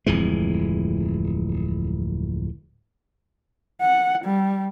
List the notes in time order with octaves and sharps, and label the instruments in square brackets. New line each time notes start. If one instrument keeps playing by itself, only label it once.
[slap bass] D1 F2 E3 G#3
[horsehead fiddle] F#5
G3